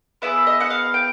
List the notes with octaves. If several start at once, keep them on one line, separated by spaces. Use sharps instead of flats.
B3 E4 G#4 E5
D#5
F#5
F5
G5